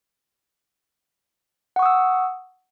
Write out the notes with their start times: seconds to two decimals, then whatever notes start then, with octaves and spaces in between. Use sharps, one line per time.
1.76 F#5
1.79 C#6
1.82 D#6
1.86 E6